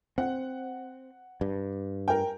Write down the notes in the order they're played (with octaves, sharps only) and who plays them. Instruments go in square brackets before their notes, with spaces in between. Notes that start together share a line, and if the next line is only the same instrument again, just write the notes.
[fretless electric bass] C4 [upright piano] F#5
[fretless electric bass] G2
[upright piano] A#4 G5